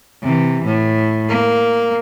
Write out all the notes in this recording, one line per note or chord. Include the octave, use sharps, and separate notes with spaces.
C3 E3
A2
A#3